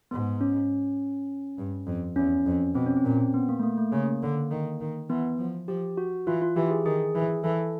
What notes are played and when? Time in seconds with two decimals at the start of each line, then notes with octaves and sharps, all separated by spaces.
0.11 G#2 B3
0.41 C#4
1.58 G2
1.86 F2
2.16 E2 C#4
2.46 F2
2.75 B2 C4
2.86 C#4
2.97 C4
3.04 A#2 C#4
3.18 C4
3.34 B3
3.49 A#3
3.59 A3
3.63 A#3
3.77 A3
3.92 C#3 A#3
4.22 D3
4.51 D#3
4.80 D#3
5.09 E3 B3
5.38 F3
5.68 F3 G4
5.97 F#4
6.27 E3 F4
6.42 F4
6.56 E3 G4
6.71 G#4
6.85 D#3 G#4
7.15 E3
7.44 E3 A4